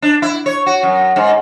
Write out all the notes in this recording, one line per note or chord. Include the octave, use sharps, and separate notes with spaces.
D4
E4
C#5
F#4
F#2
G#2